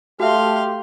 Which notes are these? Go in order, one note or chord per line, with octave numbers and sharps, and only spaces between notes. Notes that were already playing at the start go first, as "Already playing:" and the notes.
A3 F#4 G4 E5 F5 C6